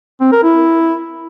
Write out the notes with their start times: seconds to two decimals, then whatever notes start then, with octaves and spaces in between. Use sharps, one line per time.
0.21 C4
0.32 A#4
0.43 E4